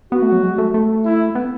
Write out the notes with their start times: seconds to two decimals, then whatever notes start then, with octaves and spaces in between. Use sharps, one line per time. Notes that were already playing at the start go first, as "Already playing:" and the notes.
0.12 B3 F#4
0.22 A3
0.32 F#3
0.43 G#3
0.58 A3
0.74 A3
1.05 E4
1.35 B3